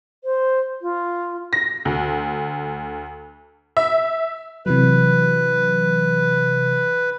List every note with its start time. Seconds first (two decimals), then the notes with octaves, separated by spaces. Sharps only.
0.24 C5
0.82 F4
1.53 A#6
1.85 D2
3.77 E5
4.66 C3 E3 F#3 B4